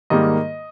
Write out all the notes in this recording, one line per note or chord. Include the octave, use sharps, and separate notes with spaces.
G#2 D#3 G3 A#3 D#5